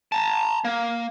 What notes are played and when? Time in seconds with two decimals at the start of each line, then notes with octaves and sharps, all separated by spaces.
0.12 A5 A#5
0.65 A#3